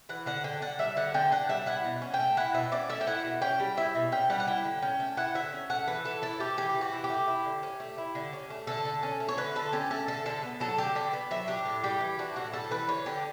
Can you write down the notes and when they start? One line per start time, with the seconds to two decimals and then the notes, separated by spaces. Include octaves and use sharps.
0.09 E3 F#5
0.26 D3 F#5
0.44 D3 G5
0.62 D4 F#5
0.79 G3 E5
0.97 D3 F#5
1.14 D3 G5
1.32 D4 F#5
1.49 G3 E5
1.66 E4 F#5
1.85 B2
2.02 C#4
2.14 G5
2.20 A3
2.37 E4 F#5
2.54 B2 E5
2.72 C#4 D5
2.89 A3 E5
3.01 G5
3.07 E4 F#5
3.25 B2
3.42 C#4 G5
3.60 G3
3.77 E4 E5
3.95 B2
4.12 C#4 G5
4.30 G3 F#5
4.40 F#5
4.47 E4 G5
4.65 D3
4.82 C#4 G5
5.00 A3
5.17 E4 F#5
5.34 D3 E5
5.53 C#4
5.70 A3 F#5
5.87 E3 B4
6.05 E3 A4
6.22 E4 A4
6.40 A3 G4
6.57 E3 G4
6.75 E3
6.81 F#4
6.93 E4
7.04 G4
7.10 A3
7.28 E4
7.45 D3
7.63 C#4
7.80 A3
7.98 E4
8.15 D3
8.33 C#4
8.50 A3
8.67 D3 A4
8.85 D3
9.03 C#4
9.20 A3
9.28 C#5
9.37 D3 B4
9.56 D3 A4
9.73 C#4 G4
9.90 A3 A4
10.08 D3 A4
10.26 D3 A4
10.43 B3
10.60 F#3 A4
10.78 D3 G4
10.95 D3 G4
11.13 B3
11.31 F#3 E5
11.48 D4 G4
11.66 A2
11.84 G3 G4
12.01 E3
12.19 D4 F#4
12.36 A2 F#4
12.53 G3 A4
12.71 E3 B4
12.88 D3 C#5
13.06 D3 G4